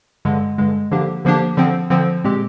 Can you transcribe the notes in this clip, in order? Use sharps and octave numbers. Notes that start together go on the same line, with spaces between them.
G2 D3 G#3
G2 D3 G#3
D3 F3 A#3 D4 G4
D3 F3 A#3 D4 G4
D3 F3 C4
D3 F3 C4
A#2 G#3 C4 G4